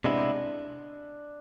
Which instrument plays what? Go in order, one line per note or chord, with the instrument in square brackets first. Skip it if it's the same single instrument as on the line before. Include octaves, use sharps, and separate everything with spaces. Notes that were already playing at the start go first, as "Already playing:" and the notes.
[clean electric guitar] C3 G#3 B3 E4 [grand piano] D4